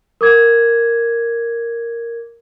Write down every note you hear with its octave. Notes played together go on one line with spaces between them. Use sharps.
A#4 D6 G#6